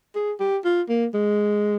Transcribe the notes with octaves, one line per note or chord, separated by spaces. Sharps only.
G#4
G4
F4
A#3
G#3